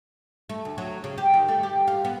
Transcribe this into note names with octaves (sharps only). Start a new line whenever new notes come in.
A3
D2
F#3
C#3
G4
D#3
A3
G4
F4
B3